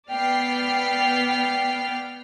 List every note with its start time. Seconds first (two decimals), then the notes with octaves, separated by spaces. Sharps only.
0.10 B3 D5 G5 F6 C7